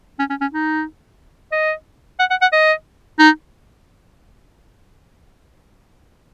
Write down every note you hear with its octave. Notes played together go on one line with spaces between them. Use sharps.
C#4
C#4
C#4
D#4
D#5
F#5
F#5
F#5
D#5
D#4